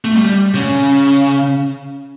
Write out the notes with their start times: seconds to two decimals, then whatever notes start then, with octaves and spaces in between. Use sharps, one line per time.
0.05 A3
0.16 G3
0.55 C#3